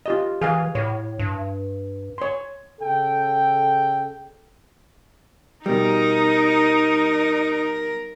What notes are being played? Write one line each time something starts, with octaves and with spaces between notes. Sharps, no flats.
F4 G4 D#5
E3 G#4 F5 G#5
A2 C#5
G2
C#5 C6
C#3 A4 G5
B2 G3 D#4 A#4